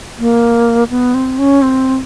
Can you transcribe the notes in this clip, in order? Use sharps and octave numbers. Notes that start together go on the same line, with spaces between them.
A#3
B3
C4
C#4
C4